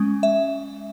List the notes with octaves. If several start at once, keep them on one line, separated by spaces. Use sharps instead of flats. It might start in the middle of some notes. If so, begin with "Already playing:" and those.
Already playing: G#3 C#4
E5